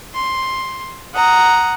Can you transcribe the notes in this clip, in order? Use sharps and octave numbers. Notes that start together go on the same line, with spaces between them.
C6
F#5 A#5 D#6